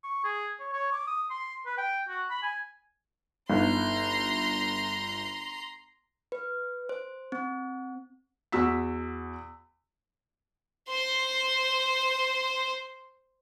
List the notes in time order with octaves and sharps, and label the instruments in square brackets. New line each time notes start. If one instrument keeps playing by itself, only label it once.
[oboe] C#6
G#4
C#5
C#5
D6
D#6
C6
B4
G5
F#4
B5
G#5
[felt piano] G1 [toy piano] D#4 F5 [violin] A#5 C6
[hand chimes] B4
C5
C4
[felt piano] E2 F#4 E6 B6
[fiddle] C5 C6